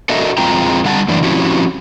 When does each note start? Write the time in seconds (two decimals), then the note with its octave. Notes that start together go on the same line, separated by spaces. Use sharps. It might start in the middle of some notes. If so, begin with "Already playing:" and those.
0.09 D4 F#4 A4 A#4 D#5 E5
0.38 F2 G#3 C4 F4 G5 A#5
0.84 D3 G3 F#5 A5
1.08 F#2 A2 E3 D4
1.23 F3 C4 C#4 E4 F#4 G4